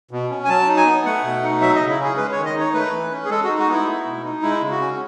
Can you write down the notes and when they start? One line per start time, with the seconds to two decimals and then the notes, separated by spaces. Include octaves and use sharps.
0.11 B2
0.30 C#4
0.45 G#5
0.48 F#3 A5
0.68 D#4
0.77 G#5
0.86 B3
1.05 A3 F#5
1.24 B2
1.43 D#4
1.61 F#3 E5
1.76 C#3 D#5
1.90 E4
1.99 C#4 G#4
2.17 G#3 B4
2.32 C#5
2.37 D#3
2.46 D#5
2.54 D#4 C#5
2.73 A3 B4
2.93 E3
3.11 C#4
3.25 G#4
3.30 G#3 A4
3.44 F#4
3.49 D#4
3.58 F#4
3.68 B3 E4
3.86 A3
4.05 B2
4.24 D#4
4.42 G#3 E4
4.61 C#3
4.71 F#4
4.81 C#4